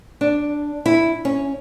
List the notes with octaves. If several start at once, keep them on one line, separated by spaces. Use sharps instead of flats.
D4
E4
C#4